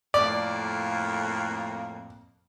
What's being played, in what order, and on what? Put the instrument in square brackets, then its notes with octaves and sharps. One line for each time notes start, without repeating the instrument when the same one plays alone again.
[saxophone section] F2 A2 A#3 [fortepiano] D5